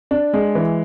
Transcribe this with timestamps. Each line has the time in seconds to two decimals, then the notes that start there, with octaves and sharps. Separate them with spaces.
0.11 D4
0.34 G#3
0.55 E3